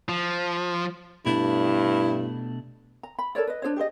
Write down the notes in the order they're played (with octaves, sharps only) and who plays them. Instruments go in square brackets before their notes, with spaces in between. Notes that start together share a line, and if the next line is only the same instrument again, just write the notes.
[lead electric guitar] F3
[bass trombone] G2 [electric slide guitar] B2 A3 D4 [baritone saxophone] E4
[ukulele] A#5
B5
A4 A#4 C#5 D5
B4 D#5
D4 G#4 C5 C#5
G4 G#4 C5 D#5